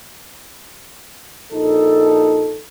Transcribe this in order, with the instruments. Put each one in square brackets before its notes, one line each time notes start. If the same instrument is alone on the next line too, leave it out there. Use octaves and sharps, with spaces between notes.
[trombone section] A#1 D#4 A4